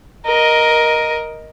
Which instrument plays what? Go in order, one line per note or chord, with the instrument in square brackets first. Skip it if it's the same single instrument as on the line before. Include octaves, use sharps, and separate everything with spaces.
[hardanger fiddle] A#4 D#5